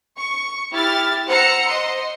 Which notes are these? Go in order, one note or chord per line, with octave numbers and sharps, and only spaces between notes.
C#6
E4 G4 F6 A6
C5 F#5 A#5 E6 C#7
C5 D#5 C6